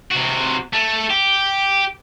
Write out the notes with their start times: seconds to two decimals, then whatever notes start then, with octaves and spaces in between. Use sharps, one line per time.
0.12 C3 F#4
0.73 A3
1.10 G4